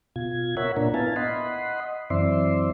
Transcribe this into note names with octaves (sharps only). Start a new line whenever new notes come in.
B2 F4 G#6
A#4 C#5 E5 F#5 B5
A#2 D4 A#4
B3 E4 F5 G#5 A5
D#5 F#5 B5 C6
F#2 E3 C4 D5 E5 C6